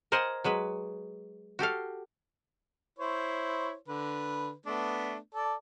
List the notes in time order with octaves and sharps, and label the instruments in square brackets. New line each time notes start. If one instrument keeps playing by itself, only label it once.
[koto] A#4 C5 D#5 F#5 G#5
F#3 G#3 B4
F#4 G4 A4 F5
[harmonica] E4 C5 C#5
D3 B4
A3 B3 D4
A4 D5